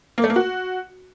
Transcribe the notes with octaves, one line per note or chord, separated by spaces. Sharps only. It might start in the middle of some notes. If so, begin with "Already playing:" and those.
A#3
A3
A#3
F#4